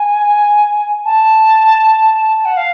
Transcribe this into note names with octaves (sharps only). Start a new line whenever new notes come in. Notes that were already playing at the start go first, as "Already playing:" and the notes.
Already playing: G#5
A5
F#5
F5